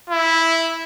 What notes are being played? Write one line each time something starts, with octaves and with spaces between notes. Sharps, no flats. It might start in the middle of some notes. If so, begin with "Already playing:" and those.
E4